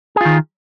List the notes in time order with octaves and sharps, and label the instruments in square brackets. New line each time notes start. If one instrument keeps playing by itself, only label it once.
[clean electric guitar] G#4
F4
D#3